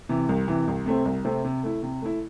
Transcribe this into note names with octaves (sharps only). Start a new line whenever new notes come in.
C3 E3
C2
C3 E3
C2
C3 A3 C4
C2
C3 A3 C4
C3
A3 E4
C3
A3 E4